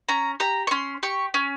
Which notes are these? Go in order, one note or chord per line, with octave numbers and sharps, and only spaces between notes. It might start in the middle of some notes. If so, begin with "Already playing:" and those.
C#4 A#5
G4 A#5
C#6
C#4 C6
G4 C#6
C#4